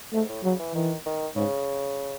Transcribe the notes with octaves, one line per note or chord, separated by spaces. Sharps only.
G#2 A3
A2
C#3 F#3
E3
D#3 E3
D#3
G#2 C#3